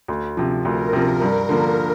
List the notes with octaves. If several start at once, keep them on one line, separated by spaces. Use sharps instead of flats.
D2
C3 F3
D2 A#4
C3 F3
G2
D3 F3 A#3